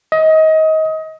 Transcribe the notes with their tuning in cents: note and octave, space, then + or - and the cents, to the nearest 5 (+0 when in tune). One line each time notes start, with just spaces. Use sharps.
D#5 +25